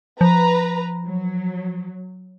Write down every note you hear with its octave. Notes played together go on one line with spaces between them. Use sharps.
F3 B4 A#5
F#3